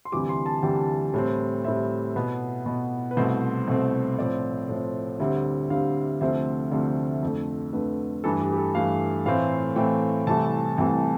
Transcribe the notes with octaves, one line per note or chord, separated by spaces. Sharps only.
C6
D2 C3 E3 G3 D6
C6
A5
D2 C3 E3 G3 G5
A2 G3 C4
A2 G3 C4 E5
B2 B3
B2 B3
B4
C2 B2 A3 C4 C5
C2 B2 A3 C4
A2 F3 C4 D5
A2 F3 C4
D2 D3 G3 C4 E5
D2 D3 G3 C4 F5
D2 C3 F3 A3 C4 E5
D2 C3 F3 A3 C4 D5
F2 D3 A3
F2 D3 A3 B4
G2 E3 A3 A4
G4
G4
A4
G2 E3 A3 F5
A2 E3 A3 C4 F5
A2 E3 A3 C4 G5
C2 C3 E3 A3 A5
C2 C3 E3 A3 G5